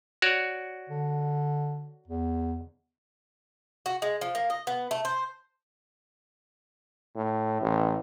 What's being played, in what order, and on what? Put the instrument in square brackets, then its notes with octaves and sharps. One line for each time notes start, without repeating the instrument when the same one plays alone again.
[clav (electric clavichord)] F#4 C#5 D5
[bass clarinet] D3
E2
[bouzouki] F#4
G#3
F3
A#3
D#5
B3
A3
C5
[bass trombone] A2
A1